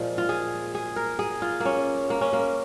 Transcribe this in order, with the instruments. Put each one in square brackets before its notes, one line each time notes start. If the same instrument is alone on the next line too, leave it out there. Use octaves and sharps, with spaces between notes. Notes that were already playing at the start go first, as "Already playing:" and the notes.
Already playing: [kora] A#2 F3 G#3
F4
G#4
G#4
A#4
G#4
F4
A#3
C#4
A#3
C#4
A#3